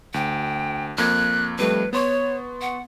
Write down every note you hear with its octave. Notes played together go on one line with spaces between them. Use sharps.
D2 G5
F2 A#3 F#6 G#6
F2 G3 A3 B4
B3 C#5 C6 C#6
F#5